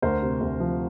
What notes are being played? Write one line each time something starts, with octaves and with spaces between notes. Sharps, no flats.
D2 A#4 C5
C3
D2
F3